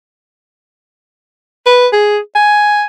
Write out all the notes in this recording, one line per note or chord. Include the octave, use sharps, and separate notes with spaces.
B4
G#4
G#5